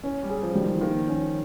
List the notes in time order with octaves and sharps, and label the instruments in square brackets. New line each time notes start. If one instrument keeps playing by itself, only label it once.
[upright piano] C#4
[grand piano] G3
[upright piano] G#4
[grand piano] F3
[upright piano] G3
[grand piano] D#3
F3
[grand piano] D#3 [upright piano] A#3
[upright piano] C#4